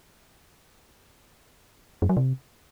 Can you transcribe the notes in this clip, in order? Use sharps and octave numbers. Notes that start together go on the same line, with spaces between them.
F#2
F#3
C3